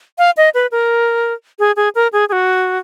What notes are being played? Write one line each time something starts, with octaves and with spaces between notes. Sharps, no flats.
F5
D#5
B4
A#4
G#4
G#4
A#4
G#4
G#4
F#4